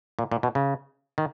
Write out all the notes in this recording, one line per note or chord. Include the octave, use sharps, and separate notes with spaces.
A#2
A#2
B2
C#3
D#3